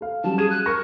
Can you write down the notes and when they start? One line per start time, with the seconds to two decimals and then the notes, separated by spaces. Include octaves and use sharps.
0.01 A4 F5
0.24 F#3 G3 C#4 A5
0.38 G#4 G#6 D#7 E7
0.50 F#6
0.66 A#4 C#6 A#6 C#7